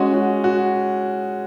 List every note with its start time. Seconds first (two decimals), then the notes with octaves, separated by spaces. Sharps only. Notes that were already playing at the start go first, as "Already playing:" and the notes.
Already playing: G#3 C#4 F#4
0.14 F#4
0.44 F#4